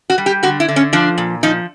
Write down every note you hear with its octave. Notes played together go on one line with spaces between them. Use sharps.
F#4
G3
G4
D3 F#4
E4
D3
C#4
F3 D4
A#2
F3 D#4